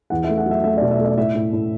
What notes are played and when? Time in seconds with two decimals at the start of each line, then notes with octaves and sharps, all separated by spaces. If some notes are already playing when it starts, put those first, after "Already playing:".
0.10 E2 F#5
0.24 E5
0.29 A3
0.38 F#5
0.46 F#3
0.51 E5
0.64 A3 E5
0.77 D5
0.81 B2
0.91 E5
0.99 A3
1.05 D5
1.17 A2 E5
1.34 A2
1.53 A2